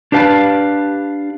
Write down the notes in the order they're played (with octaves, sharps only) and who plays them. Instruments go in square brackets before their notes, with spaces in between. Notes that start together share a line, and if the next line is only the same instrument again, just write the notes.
[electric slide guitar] D4 G4 B4 F5 A5